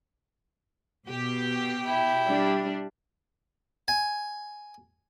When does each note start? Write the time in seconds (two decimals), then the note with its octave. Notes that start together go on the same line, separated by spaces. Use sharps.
1.08 B2 G4
1.84 E4 G5
2.27 G3 D4
3.88 G#5